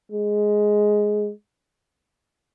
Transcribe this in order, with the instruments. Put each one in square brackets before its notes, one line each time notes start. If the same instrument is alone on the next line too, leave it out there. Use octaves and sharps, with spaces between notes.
[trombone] G#3